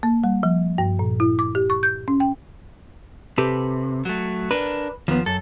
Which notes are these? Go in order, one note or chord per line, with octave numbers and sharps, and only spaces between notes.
A#3
G3
F3
G2
A#2
E4
D6
G4
C#6
G6
C#4
G5
C3 G4 A4 B4
F#3 A3
D4 A#4 B4
D#2 F3 B3
F#2 A4